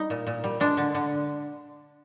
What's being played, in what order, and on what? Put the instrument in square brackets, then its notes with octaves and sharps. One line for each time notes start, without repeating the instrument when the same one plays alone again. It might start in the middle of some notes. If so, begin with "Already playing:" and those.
Already playing: [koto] G3 D#4
A#2
A#2
G3
G#3 D4
D3
D3